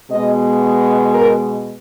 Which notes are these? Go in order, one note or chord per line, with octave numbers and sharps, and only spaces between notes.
B2 G#3 B3 D#5
A#4